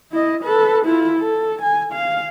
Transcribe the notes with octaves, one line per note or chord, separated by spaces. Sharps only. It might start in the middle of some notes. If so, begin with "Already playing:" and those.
E4 D#5
A4 B4
E4 F4
A4
G#5
F5